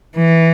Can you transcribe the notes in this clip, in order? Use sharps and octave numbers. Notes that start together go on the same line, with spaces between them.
E3